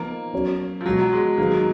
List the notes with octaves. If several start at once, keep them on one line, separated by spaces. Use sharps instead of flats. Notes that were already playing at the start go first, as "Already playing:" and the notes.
Already playing: F3 A#3 B3 D#4
F#3 C#4 F#4 C#5
F3
B2 F#3 G#3 B3 F#4
F#3
G#3
D#3 F#3 A#3 B3 D#4 G#4